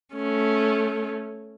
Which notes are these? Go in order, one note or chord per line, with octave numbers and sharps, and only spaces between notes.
A3 C#4